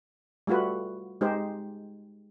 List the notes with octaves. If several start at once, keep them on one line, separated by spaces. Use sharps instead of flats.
G3 A3 F4 F#4 B4
G#3 D#4 G4 C5